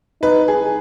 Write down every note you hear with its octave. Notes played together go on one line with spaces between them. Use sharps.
D#4 B4
G#4